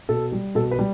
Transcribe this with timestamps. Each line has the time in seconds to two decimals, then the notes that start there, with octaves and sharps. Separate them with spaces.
0.09 B2 A4
0.32 G3
0.55 B2 A4
0.71 B4
0.79 G3